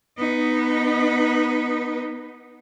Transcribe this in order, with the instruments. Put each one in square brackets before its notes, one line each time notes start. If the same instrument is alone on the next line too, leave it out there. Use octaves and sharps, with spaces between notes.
[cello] B3 D#4